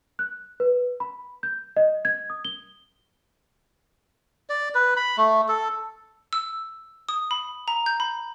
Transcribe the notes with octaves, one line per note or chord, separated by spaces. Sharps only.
F#6
B4
B5
G6
D#5
G#6
D#6
G7
D5
B4
B5
A3
A4
E6
D#6
B5
A#5
G6
B5